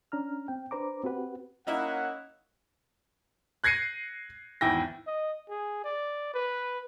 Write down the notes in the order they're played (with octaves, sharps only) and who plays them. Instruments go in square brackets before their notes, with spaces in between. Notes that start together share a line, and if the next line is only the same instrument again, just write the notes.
[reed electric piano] C#4 D4 A#5 F6
C4 G5
D4 B4 C5 A#5 D6
C4 F#4 G4 B4 F#5
[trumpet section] A#3 C#5 F#5 [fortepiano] C#4 D#4 E4
[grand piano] F#6 G#6 A#6 C7 C#7 D#7
G#1 E2 E4 G5 A#6
[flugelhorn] D#5
G#4
D5
B4